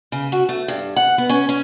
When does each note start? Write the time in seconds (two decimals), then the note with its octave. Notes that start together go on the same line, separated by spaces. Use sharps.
0.12 C#3
0.32 F#4
0.49 A3
0.68 G2
0.96 F#5
1.18 B3
1.30 C#4
1.49 C#4